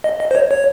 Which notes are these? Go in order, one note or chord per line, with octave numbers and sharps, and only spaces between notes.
D#5
D#5
C5
C#5
C#5